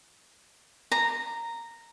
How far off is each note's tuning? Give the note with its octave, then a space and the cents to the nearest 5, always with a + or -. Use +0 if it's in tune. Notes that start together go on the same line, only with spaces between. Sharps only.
A#5 -10